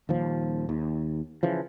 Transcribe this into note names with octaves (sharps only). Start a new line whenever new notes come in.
D#1 D#2 F3
D#2
C#3 E3 F3